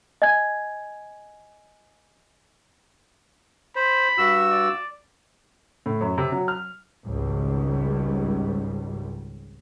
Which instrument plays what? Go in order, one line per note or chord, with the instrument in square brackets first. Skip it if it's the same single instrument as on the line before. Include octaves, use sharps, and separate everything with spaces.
[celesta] D#5 G#5 G#6
[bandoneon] C5 [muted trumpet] B5
[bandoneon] G2 F#4 E6
[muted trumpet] D5
[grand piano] A2
F#2
C3
F#3
F6
[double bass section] G#1 C#2 G#2 G3